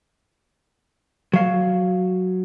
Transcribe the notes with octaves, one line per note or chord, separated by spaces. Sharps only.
F#3 F5